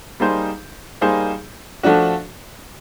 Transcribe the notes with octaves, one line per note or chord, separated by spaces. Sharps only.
G3 A#3 D#4 G#4 C5
G3 A#3 D#4 G#4 C5
F3 A3 D4 F#4